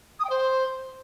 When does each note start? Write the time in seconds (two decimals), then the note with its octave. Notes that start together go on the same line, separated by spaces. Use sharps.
0.19 D#6
0.24 G5
0.29 C5